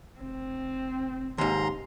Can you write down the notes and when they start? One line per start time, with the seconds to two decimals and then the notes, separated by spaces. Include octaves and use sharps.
0.21 F1 C4
1.38 D#2 G#2 A#5 C6